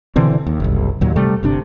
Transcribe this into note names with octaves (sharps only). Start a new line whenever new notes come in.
B2 D3 E3 C4
D#2
F#1 C2
D#2 A#2 F#3
C3 G3 A3
G1 C3 D4